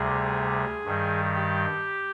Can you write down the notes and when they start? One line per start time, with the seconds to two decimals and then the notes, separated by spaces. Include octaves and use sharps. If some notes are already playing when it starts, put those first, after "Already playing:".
Already playing: D2 C3 G3 G#4
0.85 G2 D#3 G3
1.35 G4